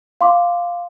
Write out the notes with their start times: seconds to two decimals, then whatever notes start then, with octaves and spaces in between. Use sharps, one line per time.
0.21 F5 C6 D6